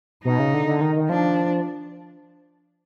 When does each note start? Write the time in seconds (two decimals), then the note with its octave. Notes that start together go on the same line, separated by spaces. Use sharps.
0.25 B2 D#4
0.39 C#3
0.54 D3
0.67 D3
0.81 D#3
0.96 D#3
1.09 F3 D4